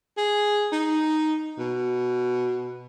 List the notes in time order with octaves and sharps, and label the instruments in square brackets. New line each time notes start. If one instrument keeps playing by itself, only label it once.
[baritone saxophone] G#4
D#4
B2